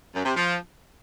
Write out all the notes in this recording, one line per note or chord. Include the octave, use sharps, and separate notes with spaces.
F#2
C3
F3